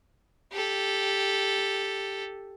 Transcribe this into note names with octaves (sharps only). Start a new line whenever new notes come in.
G4 A4